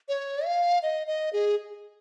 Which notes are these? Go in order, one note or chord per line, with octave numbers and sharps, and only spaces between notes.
C#5
F5
D#5
D#5
G#4